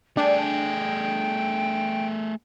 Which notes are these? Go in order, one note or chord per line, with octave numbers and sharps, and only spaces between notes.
A3 D4 G#4 G5